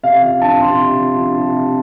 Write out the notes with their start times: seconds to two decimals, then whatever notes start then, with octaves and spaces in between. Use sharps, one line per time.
0.03 C3 F5
0.22 F3 F5
0.41 D4 A5
0.60 C3 C6
0.79 C3
0.99 F3
1.18 D4
1.37 C3
1.56 C3